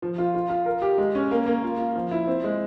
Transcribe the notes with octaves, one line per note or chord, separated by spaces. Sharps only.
F3
F4
F4
F4
A#4
G4
G#3
C#4
A#3
A#3
F4
F4
F3
E4
C4
G#3